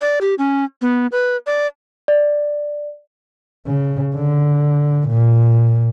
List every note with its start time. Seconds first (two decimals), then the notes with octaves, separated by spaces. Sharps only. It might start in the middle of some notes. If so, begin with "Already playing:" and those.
0.01 D5
0.21 G4
0.38 C#4
0.82 B3
1.12 B4
1.47 D5
2.08 D5
3.67 C#3
4.15 D3
5.08 A#2